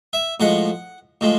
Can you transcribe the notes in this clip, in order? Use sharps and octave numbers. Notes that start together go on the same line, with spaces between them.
E5
A2 F3 G#3 F#5
A2 F3 G#3